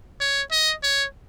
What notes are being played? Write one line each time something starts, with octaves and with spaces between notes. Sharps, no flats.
C#5
D#5
C#5